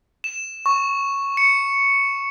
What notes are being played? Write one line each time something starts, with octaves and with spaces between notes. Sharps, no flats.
E7
C#6
C#7